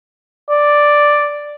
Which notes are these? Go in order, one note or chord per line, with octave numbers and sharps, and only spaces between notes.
D5